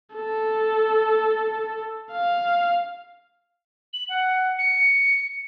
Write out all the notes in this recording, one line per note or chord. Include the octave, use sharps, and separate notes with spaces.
A4
F5
F#7
F#5
C#7